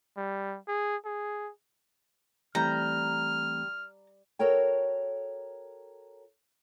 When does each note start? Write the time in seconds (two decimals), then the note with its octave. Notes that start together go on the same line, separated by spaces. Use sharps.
0.17 G3
0.68 G#4
1.05 G#4
2.55 E3 G3 A3 C4 A#5 F6
4.39 F#4 A4 A#4 C#5 G5